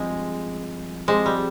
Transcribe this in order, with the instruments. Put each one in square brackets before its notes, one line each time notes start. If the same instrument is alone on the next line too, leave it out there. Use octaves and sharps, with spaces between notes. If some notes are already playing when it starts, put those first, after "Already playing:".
Already playing: [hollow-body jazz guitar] G2 F3 C4 G4 [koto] G#3
[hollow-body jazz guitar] F3 C4 G4 C5 [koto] G#3
[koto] G3